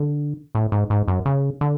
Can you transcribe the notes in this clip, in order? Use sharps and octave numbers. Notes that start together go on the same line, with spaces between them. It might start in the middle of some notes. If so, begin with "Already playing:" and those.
Already playing: D3
A2
G#2
G#2
F#2
C#3
D3